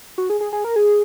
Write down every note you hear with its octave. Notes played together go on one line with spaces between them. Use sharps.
F#4
G#4
G#4
G#4
A#4
G#4